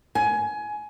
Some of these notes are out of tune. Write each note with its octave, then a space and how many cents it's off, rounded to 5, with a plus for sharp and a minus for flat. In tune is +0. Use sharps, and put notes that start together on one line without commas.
G#5 +20